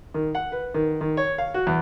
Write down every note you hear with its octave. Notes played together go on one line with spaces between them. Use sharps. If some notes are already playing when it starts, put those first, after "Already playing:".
D#3
F#5
B4
D#3
D#3
C#5
F5
F#4
E2